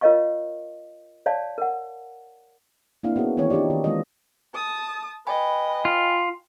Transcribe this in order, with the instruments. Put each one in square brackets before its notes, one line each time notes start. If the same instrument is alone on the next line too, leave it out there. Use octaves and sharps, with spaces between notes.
[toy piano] F4 A#4 C#5 D#5 F5 C#6
C#5 D5 F5 A5
A#4 F#5
[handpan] A#3 C4 D4 E4 F5
B3 C#4 F#4 G#4
D#3 E3 A#3 C4 C#5
D4 D#4 F4 G4 D5
D#3
E3 G#3 C4 F4 D#5
[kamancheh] A5 D#6
[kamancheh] B4 D#5 [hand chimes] G5 G#5 B5
[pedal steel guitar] F4